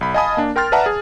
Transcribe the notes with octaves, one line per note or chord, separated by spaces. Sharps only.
B1 B5
D#5 F5 G#5 A5 B5 D#6
A#3 D4
A#4 G5 C6 F6 A6
B4 D5 E5 F#5 A5 A#5
G#4